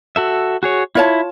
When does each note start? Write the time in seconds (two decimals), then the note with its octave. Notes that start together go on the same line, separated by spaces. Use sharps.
0.16 F#4 A4 E5
0.63 F#4 G#4 C#5
0.95 E4 F4 C#5 A5